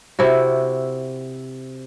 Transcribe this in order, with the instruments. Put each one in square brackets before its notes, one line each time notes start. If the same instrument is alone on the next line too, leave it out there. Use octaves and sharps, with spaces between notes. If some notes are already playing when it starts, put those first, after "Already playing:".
[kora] C3 E4 F#4